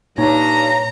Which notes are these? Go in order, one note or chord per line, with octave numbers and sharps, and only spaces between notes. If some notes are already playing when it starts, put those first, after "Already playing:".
G2 A#2 D#4 C#5 A#5